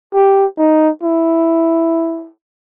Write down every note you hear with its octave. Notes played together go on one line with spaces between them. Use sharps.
G4
D#4
E4